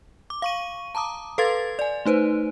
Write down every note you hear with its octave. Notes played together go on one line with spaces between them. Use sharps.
D6
F5 C#6 D#7
A5 A#5 D6 D#6
A4 B4 F5 C6 G#6 A6
D5 G#5
A3 D#4 B4 C5